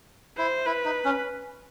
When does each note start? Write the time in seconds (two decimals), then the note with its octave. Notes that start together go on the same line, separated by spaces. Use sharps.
0.37 E4 C5
0.66 E4 B4
0.85 D#4
1.05 C#4